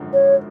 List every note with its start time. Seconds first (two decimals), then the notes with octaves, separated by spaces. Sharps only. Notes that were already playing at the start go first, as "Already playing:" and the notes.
Already playing: G#1 F#2 D3 F3 G#3
0.13 C#5